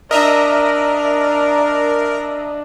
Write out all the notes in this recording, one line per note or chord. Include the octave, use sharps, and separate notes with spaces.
D4 A#4 D#5 E5 A#5